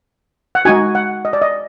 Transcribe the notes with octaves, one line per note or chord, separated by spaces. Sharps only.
F#5
G#3 D#4 F#4 G#5
F#5
D#5
D5
D#5